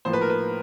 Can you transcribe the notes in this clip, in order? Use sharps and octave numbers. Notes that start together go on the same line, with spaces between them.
A2 F3 A#3 C5
B4
A#4
B4